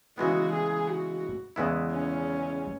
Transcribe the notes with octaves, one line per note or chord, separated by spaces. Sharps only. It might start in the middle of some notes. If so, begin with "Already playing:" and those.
C#3 E3 G#3 B3 F#4
G#4
F#4
E2 C#3 G#3 B3 E4
C#4